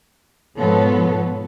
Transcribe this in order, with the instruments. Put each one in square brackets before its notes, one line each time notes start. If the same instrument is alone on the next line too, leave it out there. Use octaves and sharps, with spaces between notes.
[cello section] G#2 B2 F3 B3 A4 C#5